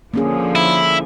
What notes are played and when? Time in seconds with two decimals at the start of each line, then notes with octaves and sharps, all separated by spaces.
0.14 D3 F3 A#3 C#4 G#4
0.55 E4